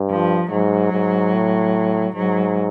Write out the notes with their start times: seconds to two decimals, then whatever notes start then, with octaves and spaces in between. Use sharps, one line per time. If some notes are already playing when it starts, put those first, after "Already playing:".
Already playing: G2
0.10 F3
0.50 G#2 F#3
0.93 G#2
1.33 A2
2.16 G#2 F#3